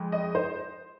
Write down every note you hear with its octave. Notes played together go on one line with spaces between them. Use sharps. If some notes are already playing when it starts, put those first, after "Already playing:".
Already playing: F2 G#3
D#5
C5